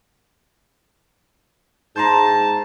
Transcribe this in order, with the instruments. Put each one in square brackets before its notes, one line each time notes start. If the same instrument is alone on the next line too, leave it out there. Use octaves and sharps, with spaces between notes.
[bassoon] G#2 [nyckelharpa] A5 [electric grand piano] A#5 C6 G6